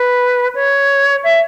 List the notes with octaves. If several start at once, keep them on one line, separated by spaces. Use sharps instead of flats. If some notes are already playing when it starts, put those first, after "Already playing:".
Already playing: B4
C#5
E5